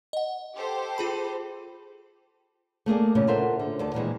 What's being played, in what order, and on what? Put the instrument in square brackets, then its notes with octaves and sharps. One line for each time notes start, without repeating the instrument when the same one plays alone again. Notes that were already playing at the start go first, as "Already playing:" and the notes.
[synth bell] D#5 F#5
[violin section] G4 A4 C5
[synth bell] F4 G#4 B5
[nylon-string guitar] A3 A#3 G#4 D5
E2 A#2 C#3 C#4
F4 A4 A#4 C5 E5 F#5
D3
D2 D3 D5 A5
A#2 D#3 E3 G#3